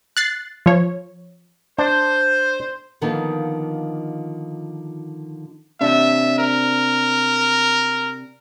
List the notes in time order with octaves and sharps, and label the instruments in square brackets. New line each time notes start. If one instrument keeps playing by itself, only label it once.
[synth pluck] F#6 A6 C7
F3 C#5
[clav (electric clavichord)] D4 [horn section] C5
[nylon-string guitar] D3 D#3 F3 A#3 B3 D#4
[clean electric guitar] C3 D4 [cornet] E5
[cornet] A#4